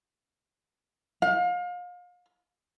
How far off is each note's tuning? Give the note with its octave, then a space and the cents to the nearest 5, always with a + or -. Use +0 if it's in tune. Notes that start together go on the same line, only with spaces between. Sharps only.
F5 +35